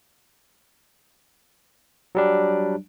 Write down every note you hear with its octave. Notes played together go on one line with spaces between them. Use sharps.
F#3 G3 D4